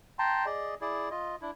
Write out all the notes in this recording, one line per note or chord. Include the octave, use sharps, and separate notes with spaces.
G5 A5 A#5 C6
G#4 D5 D#5
E4 G#4 D5
F4 D#5
D4 E4